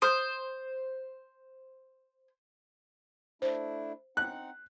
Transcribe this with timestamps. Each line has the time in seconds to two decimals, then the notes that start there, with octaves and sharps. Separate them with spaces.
0.02 C5 D#6 F6 G6
3.42 A3 D4 E4 C5
4.17 C4 D#4 F#5 F#6